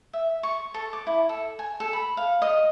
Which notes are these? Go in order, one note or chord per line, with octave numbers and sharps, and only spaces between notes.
E5
C#6
A4
D6
E4
A4
G#5
A4
B5
F5
D#5